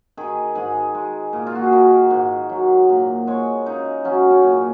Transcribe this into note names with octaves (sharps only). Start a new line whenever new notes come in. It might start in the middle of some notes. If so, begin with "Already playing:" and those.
D#3 G#4
G#2 G#4
G#3
A#2
F4
F#4
G#4
D#3 A#4
G#2
F#3
A#2
G#3 C#5
C#3 D#4
F#3 C#4
C#4
A#2